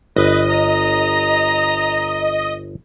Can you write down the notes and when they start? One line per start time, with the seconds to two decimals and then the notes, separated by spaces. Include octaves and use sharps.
0.16 G1 B4 D#5
0.50 A#5